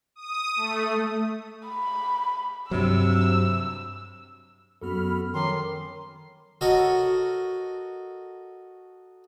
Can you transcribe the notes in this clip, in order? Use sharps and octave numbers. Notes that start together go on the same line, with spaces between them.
D#6
A3
B5
G2 C3 F#3 E6
F#2 B3 F#4 A4 B5 F6
D#3 F3 F#3 C#4 C6 D6
F#4 A4 A#4 C#5 D#5